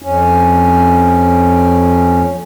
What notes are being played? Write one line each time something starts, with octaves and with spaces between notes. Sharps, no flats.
F2 C#4